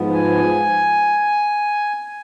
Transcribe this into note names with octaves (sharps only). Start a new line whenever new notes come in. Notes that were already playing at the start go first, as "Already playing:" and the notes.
Already playing: G#2 F3 B3
G#5